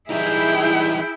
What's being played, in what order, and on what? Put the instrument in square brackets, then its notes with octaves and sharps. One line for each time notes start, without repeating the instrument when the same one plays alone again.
[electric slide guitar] E3 G3 D#4 [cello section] E4 [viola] G#4 G5